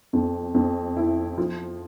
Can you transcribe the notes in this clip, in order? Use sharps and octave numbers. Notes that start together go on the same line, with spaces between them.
F2
F2
E4
F3